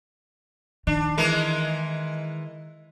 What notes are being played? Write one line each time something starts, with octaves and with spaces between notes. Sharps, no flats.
D#3 D4
E3 G#3 A#4